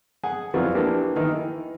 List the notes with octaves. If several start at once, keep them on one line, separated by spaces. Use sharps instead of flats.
G#4 F#5 G#5
F2 E3 F#3 F4 D5
E3 A#3 D4 G4
D#3 E3 A#4
E3